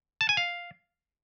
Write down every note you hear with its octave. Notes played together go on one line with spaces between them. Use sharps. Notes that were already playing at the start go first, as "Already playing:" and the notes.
A5
G#5
F5